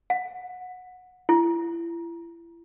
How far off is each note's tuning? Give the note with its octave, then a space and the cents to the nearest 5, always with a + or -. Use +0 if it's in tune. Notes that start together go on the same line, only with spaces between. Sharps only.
F#5 -20
E4 +35